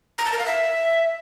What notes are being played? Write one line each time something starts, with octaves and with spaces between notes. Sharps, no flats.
A#5
A5
A#4
F5
E5